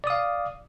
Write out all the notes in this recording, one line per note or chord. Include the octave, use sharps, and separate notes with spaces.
D5 F5 D#6